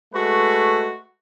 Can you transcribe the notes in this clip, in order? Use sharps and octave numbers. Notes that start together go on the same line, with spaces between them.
G#3 A3 F#4 B4